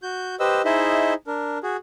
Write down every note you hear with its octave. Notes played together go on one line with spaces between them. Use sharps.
F#4 G6
G4 B4 C5 D#5 E6
D#4 E4 G#4 C5 D#5 E5
D4 A#4
F#4 G#4